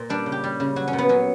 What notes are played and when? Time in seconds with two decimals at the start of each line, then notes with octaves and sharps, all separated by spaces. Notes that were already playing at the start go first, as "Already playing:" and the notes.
Already playing: A#2
0.09 G3 D4
0.26 C#3
0.32 G4
0.44 G3
0.60 C#3
0.76 F#3 F#4
0.88 C#4
0.93 A#2
0.98 B3
1.09 F#3 C#4